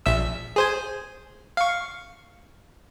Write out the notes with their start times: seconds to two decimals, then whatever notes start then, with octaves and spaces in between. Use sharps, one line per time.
0.06 A#1 E5 E6
0.56 G#4 C5 G#5
1.57 F5 C#6